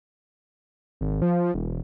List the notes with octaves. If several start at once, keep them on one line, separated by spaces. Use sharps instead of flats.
G#1
F3
E1